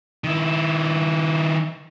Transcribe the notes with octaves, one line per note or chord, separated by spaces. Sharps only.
D#3 E4